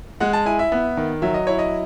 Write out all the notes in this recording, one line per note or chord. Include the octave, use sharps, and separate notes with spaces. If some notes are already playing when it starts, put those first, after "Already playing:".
G#3 F#5
A5
E4 G#5
E5
B3
D#3
F#3 E5
D#5
E4 C#5
D#5